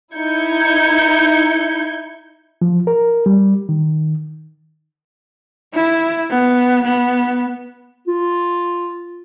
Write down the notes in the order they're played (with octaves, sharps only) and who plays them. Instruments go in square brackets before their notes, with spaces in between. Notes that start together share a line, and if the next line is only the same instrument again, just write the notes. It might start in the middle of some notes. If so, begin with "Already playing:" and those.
[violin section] D#4 E4 G6 G#6 C#7
[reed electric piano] F3
A#4
G3
D#3
[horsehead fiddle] E4
B3
B3
[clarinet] F4